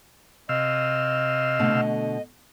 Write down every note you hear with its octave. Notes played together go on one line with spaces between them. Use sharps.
C3 D#5 F5 E6
B2 D3 A3